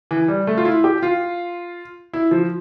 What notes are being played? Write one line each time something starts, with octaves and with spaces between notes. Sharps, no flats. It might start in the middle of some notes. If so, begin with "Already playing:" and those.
E3
G3
A3
F4
E4
G4
F4
E4
F3